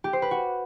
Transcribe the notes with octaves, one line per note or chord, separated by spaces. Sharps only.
G4
C5
B4
F#4